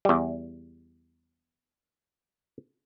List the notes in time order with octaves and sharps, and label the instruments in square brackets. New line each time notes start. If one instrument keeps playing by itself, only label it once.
[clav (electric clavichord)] E2 G3